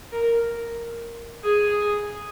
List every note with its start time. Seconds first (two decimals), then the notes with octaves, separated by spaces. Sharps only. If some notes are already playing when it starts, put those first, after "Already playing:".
0.12 A#4
1.44 G#4